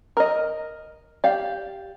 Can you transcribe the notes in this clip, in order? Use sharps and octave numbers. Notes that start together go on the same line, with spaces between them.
A#4 D#5
G4 D5 F5